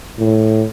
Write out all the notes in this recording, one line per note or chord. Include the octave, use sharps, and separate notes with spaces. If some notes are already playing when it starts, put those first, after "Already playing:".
A2